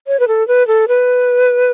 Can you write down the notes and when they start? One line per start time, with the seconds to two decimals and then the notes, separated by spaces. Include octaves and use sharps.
0.07 C#5
0.19 B4
0.28 A4
0.48 B4
0.67 A4
0.88 B4